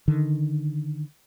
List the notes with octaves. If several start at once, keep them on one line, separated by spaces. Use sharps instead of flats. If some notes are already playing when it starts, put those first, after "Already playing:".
D3 D#3